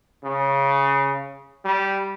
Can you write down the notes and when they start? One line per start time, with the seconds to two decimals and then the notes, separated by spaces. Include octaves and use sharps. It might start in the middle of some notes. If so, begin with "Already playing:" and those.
0.24 C#3
1.65 G3